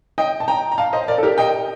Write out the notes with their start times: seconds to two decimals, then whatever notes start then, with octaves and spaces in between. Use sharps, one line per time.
0.18 D#5 G5
0.40 A5
0.48 G5 A#5
0.72 A#5
0.78 F5 A5
0.93 C5 D#5
1.08 A#4 D5
1.18 A4
1.23 G4 A#4
1.38 D#5 G5